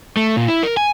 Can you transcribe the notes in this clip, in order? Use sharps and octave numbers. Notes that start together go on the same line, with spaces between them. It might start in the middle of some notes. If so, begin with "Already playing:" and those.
A3
A#2
E4
A#4
G#5